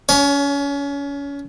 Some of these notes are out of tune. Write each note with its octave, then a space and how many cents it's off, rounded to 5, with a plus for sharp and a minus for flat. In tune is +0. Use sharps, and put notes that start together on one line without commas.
C#4 +30 C#5 +0